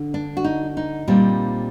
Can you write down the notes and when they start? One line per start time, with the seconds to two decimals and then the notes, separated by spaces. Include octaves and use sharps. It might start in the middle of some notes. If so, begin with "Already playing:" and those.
Already playing: D3
0.14 D4
0.37 F#4
0.44 D#4
0.77 D#4
1.08 A#2 G3 C4